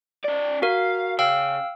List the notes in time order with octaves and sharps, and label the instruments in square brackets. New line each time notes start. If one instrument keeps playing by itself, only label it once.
[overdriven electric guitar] C#4 D5
[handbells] F#4 A#4 [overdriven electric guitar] F5
[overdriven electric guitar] C#3 [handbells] F5 G5 E6